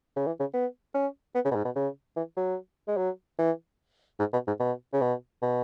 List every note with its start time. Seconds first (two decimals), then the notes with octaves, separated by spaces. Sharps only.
0.16 C#3
0.26 E3
0.40 C#3
0.54 B3
0.95 C#4
1.35 B3
1.45 C#3
1.51 B2
1.55 G#2
1.65 B2
1.76 C#3
2.16 E3
2.37 F#3
2.88 G#3
2.97 F#3
3.39 E3
4.19 G#2
4.33 B2
4.47 G#2
4.60 B2
4.93 C#3
5.01 B2
5.42 B2